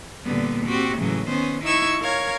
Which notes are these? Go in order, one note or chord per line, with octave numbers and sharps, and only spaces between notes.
A#2 D3 G3 B3
C4 F#4 G4
A2 C#3 E3 F#3
D#3 B3 C#4 C5
D#4 E4 C#6 E6 G#6
A#4 C#5 F5 G#6